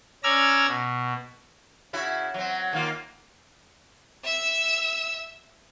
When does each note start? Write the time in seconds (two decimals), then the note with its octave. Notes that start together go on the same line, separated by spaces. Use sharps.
0.24 C#4 D5 A#5 E6 F6 G#6
0.67 B2
1.93 C#3 E4 F#4
2.34 F#3 C4
2.73 D#3 A#3 F4
4.24 E5 E6